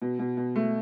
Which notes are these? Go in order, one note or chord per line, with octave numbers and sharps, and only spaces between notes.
B2
B2
B2
A3